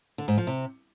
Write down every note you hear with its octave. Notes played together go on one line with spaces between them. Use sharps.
D3
G#2
F3
C3